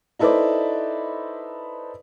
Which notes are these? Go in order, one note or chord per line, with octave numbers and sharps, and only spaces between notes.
D#4 E4 A4 B4 C5 D5